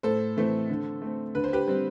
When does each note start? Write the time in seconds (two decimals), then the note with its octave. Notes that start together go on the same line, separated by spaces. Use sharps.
0.03 A2 A4 C5
0.37 E3 A3 C4
0.69 D3
1.02 A3 C4
1.35 D3 B4
1.44 C5
1.53 G4 B4
1.68 G3 C4